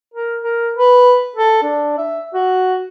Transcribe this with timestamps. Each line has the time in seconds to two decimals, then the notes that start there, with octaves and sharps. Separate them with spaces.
0.14 A#4
0.42 A#4
0.76 B4
1.36 A4
1.63 D4
1.98 E5
2.34 F#4